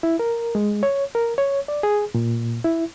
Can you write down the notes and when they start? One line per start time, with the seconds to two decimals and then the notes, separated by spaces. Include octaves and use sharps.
0.03 E4
0.19 A#4
0.55 G#3
0.83 C#5
1.15 A#4
1.38 C#5
1.68 D5
1.83 G#4
2.15 A#2
2.64 E4